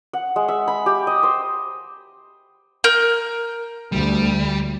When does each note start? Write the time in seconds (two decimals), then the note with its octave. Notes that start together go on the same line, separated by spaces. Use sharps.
0.13 F#5
0.36 G#3
0.48 E5
0.68 B5
0.86 G4
1.07 D#5
1.23 C5
2.84 A#4 G6
3.92 D2 G3